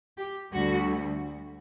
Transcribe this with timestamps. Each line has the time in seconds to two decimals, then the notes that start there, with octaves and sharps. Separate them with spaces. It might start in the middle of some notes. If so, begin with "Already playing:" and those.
0.17 G4
0.53 D2 D3 G3 F#4